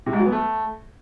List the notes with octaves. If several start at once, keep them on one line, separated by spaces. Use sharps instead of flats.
C3
G#2
F#3
B3
A3